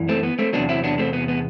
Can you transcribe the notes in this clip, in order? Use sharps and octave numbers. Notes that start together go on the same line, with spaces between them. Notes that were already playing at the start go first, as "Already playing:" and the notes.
Already playing: F#2 E3
A3 C4
B3
A3 C4
E2 C3 F#3 B3 D4
C4 E4
B3 D4
A3 C4
B3
B3